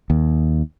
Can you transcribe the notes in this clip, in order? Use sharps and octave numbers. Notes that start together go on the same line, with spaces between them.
D#2